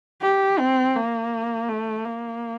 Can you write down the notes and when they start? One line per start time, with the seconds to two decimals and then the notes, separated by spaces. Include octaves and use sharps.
0.22 G4
0.59 C4
0.96 A#3
1.69 A3
2.05 A#3